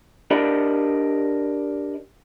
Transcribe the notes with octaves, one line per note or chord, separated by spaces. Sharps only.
D4 G4 A#4 D5 D#5 B5